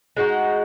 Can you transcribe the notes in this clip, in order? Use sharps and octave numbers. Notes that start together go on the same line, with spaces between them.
G#3 D#4 F#4